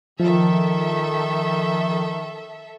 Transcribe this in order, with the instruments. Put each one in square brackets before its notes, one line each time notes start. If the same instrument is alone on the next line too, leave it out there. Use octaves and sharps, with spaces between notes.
[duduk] D#3 [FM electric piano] F3 [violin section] A4 E5